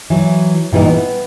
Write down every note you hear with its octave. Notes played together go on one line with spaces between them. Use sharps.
E3 F#3
A#2 E3 G3 D#4
B3